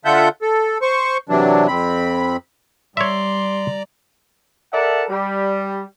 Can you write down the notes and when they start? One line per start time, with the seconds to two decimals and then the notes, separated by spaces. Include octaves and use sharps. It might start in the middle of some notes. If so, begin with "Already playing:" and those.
0.05 D3 F4 A4 E5 F#5 G6
0.42 A4
0.82 C5 C#6
1.29 C3 E3 F#3 D4
1.68 F2 C4 B5
2.97 G3 C#5 D5 E5 A#5 C6 D6
4.72 A4 A#4 D5 E5 F#5 A5
5.09 G3